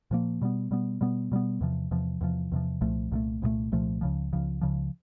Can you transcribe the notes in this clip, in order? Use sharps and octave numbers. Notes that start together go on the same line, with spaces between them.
A#2 F3 A#3
B2 G3 B3
B2 G3 B3
B2 G3 B3
B2 G3 B3
E2 C3 F3
E2 C3 F3
E2 C3 F3
E2 C3 F3
C2 A#2 F3 A3
C2 A#2 F3 A3
C2 A#2 F3 A3
C2 A#2 F3 A3
C#2 C#3 F3
C#2 C#3 F3
C#2 C#3 F3